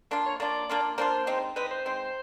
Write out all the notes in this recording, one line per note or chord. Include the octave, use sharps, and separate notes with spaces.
A#3 D4 F4
C#5
A#3 D4 F4 D5
A#3 D4 F4
A#3 D4 F4 C5
G#3 C4 D#4
G#3 C4 D#4 B4
C5
G#3 C4 D#4